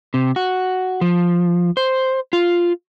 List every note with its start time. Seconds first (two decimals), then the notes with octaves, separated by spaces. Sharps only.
0.14 C3
0.36 F#4
1.01 F3
1.77 C5
2.33 F4